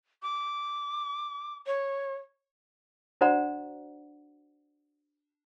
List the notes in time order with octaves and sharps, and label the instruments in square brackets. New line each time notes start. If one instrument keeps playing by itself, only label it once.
[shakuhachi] D6
C#5
[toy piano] D4 F#4 C5 D5 F#5 A#5